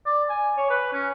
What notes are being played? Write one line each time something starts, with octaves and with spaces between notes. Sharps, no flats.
D5
G#5
C#5
B4
C#4